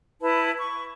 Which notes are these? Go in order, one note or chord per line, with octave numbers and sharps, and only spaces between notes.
E4 B4 A5
C#6